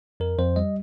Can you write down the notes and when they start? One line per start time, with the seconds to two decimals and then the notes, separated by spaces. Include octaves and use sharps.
0.20 F2 A#4
0.38 F2 C5
0.56 G3 D#5